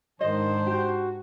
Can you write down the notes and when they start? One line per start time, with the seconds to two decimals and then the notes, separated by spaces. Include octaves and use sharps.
0.21 G#2 D#3 D4 C5 D#5
0.67 F#4 G4